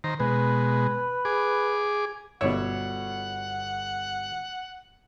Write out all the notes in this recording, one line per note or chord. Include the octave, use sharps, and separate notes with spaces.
D#3 C5 A#5
B2 G#3 B4
G#4 D6
G1 B2 C#5 D5 E5 F#5